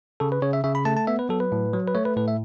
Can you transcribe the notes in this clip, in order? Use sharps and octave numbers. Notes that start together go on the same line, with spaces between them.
C#3 A4
B4
C#3 C#5
E5
C#3 E5
B5
A3 A5
A5
B3 E5
B4
F#3 A4
B4
A2
F#3
B4
A3 C#5
B4
A2 B4
E5